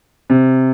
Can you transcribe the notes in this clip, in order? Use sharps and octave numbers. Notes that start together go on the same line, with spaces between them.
C3